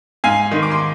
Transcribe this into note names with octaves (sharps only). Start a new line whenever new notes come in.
G#2 F5 G#5
D#3 G#3
D6
C6